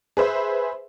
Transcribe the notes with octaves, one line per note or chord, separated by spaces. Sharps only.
G#4 B4 C5 E5